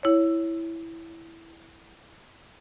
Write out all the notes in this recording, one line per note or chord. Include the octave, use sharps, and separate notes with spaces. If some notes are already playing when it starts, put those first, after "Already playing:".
E4 C#5